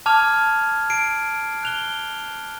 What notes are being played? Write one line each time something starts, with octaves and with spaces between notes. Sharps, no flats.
A5 D6 F6 G#6 F7
A5 C7 D7
F#6 F7 G7